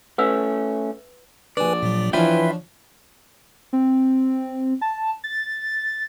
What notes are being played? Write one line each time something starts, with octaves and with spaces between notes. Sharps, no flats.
A3 C#4 B4 F#5 E6
A#1 D4 B4 D5 G#5
A#2 F#3
E3 F3 C#4 D4 F4 B4 E5 G5
C4
A5
A6